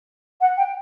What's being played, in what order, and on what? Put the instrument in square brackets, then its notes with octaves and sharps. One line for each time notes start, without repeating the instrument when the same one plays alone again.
[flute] F#5
G5